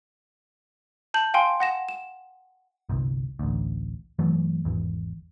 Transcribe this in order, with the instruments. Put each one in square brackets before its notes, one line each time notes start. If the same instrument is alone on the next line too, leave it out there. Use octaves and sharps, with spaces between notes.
[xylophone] A5 G6 F#7
F5 G5 G#5 C6
F#5 A#6 E7
E7
[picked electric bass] G1 C2
A1 D2
G2 E3 F#3 A3
G#1 E2